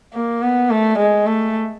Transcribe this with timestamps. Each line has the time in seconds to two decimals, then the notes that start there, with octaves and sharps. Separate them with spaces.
0.14 A#3
0.42 B3
0.70 A3
0.99 G#3
1.26 A3